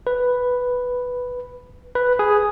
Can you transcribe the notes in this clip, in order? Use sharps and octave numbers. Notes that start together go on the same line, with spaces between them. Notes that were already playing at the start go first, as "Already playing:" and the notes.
B4
B4
G#4